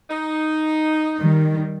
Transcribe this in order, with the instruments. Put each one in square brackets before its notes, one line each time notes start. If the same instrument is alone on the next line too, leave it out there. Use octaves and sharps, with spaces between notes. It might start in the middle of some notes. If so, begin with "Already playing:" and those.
[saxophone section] D#4
[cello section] D#3 G3